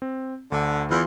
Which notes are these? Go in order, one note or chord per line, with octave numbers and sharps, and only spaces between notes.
C4
D2 D3
E2 E3 F4 C6